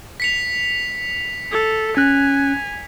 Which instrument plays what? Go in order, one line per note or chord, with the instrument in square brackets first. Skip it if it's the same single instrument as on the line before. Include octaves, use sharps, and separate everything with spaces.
[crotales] B6 C#7 F7
[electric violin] A4
[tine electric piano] C#4 F#6 [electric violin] G#5